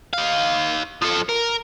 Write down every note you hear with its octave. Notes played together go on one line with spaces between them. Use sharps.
D#4 F5
F3 A4
A#4